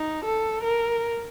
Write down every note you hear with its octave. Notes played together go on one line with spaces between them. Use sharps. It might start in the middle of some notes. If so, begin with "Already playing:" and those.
Already playing: D#4
A4
A#4